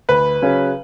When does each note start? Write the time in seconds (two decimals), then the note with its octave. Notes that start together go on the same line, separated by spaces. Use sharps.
0.09 D2 B4
0.42 C#3 F#3 C#4